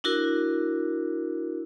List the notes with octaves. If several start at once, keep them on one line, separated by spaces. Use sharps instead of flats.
D4 E4 F#4 A#4